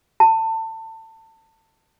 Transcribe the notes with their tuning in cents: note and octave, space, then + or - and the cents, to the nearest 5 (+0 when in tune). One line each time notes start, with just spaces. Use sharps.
A5 +25